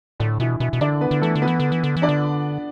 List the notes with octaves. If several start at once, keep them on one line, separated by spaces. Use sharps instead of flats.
A2 D3 D4
B2 E3 E4
B2 E3 E4
B2
D3 D4 D5
B3 B4
D3
E3 A3 A4
D3
B3 B4
E3
D3
E3
D3
E3
D4 D5
D3